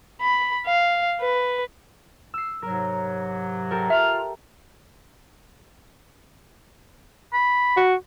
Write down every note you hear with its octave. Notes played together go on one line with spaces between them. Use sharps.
B5
F5
B4
E6 C7
G#2 C3 F#3 A#4
G4 A4 A#4
F4 E5 F6
B5
F#4